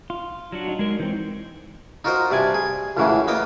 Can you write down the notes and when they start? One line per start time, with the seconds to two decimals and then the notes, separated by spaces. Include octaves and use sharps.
0.10 F4
0.52 F#3 D4 F#4
0.68 D#4
0.79 G#3 A#4
1.00 E3 C4 D#4
2.04 D#4 F4 F#4 A#4 C5 D#5
2.31 G2 C3 D5 G#5
2.54 G#4
2.97 C#2 F#2 A2 C#3 E3 F#3
3.28 A#3 B3 D#5 F5 G5